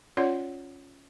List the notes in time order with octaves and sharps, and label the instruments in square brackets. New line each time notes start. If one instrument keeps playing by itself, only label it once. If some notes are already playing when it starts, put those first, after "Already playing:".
[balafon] C#4 F4 C#5 D5 F#5